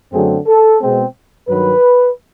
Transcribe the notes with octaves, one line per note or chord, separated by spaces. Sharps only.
F#2 D3 F#3 A3 C4 G#4
A4
B2 G#3 C4
G2 D#3 F#3 B4